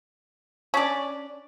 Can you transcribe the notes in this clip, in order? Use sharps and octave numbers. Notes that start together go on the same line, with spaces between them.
C#4 D4 D5